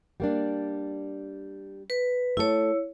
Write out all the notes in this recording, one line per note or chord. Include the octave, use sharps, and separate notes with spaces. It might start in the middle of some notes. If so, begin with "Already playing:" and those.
G3 A#3 D4
B4
A3 E4 A4 C#5